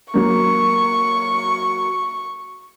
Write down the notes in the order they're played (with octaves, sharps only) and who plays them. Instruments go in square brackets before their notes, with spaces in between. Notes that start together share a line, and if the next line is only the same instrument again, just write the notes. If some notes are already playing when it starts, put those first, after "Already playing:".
[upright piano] F#3 A#3 [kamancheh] C#6